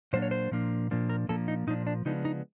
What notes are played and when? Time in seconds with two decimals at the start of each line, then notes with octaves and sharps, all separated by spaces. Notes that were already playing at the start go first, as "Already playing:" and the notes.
0.13 A#2 F#3 A#3 D4 C5
0.22 C#5
0.31 C5
0.51 A#2 F3 A#3 D4
0.91 A#2 F3 A#3 D4
1.09 A#4
1.28 A#2 F3 A#3 D4 A4
1.48 D#4
1.67 A#2 F3 A#3 D4 D#4
1.87 D4
2.05 C#3 F3 G#3 B3 D4 D#4
2.25 D#4